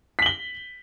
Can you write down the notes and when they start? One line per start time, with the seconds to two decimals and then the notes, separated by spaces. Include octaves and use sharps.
0.19 B6
0.22 F#7
0.26 G7